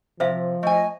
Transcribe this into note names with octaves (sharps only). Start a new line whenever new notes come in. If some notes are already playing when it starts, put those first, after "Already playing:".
C3 F3 C5 E5 F5
A3 D#5 G#5